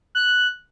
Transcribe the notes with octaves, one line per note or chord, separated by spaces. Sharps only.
F#6